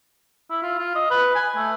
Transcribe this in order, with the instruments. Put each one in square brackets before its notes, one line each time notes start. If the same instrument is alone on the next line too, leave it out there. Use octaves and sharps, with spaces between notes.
[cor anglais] E4
F4
F4
D#5
B4
G#5
A3